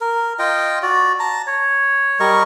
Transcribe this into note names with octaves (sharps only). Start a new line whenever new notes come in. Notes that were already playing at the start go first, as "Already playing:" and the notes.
A#4
F4 D#5 G5
F#4 D5
A5 A#5
C#5
G3 A#4 D#5 C#6